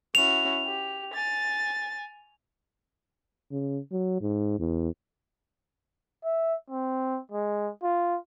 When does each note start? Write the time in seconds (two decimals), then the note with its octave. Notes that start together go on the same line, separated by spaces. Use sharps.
0.15 C#4 E4 F#4 F7
0.66 G4
1.14 G#5 A6
3.51 C#3
3.92 F#3
4.21 G#2
4.59 E2
6.24 E5
6.70 C4
7.32 G#3
7.83 F4